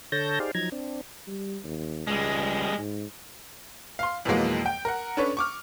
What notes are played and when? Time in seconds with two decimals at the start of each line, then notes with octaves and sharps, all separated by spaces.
0.12 D3 A4 C#5 A5 G6 A#6
0.40 D#4 G4 G#4 C5 D5 F5
0.55 F3 F#3 D#4 A#5 G#6
0.72 C4 D4
1.27 G3
1.64 D#2
2.07 C#2 G3 G#3
2.78 G#2
3.99 F5 C6
4.25 F2 B2 E3 F#3 G#3 A#3
4.66 G5
4.85 A#4 F#5
5.17 C#4 D4 A4 B4 C#5
5.37 C#6 D6 F6